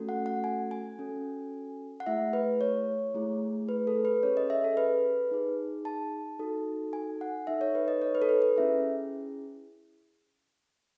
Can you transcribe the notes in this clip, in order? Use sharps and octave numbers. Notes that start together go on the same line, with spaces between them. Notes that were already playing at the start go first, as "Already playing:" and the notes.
Already playing: A3 C#4 F#4 A4
F#5
F#5
G#5
G#5
C#4 F#4 A4
F#5
A3 E4 G#4 E5
B4
C#5
A3 E4 G#4
B4
A4
B4
C#4 G#4 C#5
D#5
E5
A4
B4
D#4 G#4
A5
D#4 F#4 A4
G#5
F#5
D#4 A4 E5
C#5
B4
D#5
C#5
B4
A4
B4
B4
C#4 E4 G#4 E5